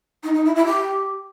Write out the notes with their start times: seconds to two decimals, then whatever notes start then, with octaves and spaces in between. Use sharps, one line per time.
0.23 D#4
0.34 D#4
0.45 E4
0.55 E4
0.66 G4